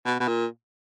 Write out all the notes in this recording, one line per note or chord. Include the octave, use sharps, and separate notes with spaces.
B2
B2
A#2